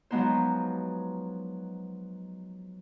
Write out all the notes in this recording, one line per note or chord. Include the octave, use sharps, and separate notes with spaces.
F3 F#3 G#3 B3 D#4 C5